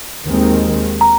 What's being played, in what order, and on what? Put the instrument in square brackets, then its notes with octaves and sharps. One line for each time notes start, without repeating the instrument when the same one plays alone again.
[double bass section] D#2 D#3 G#3 C4
[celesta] A#5